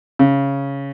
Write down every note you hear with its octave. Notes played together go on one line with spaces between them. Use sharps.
C#3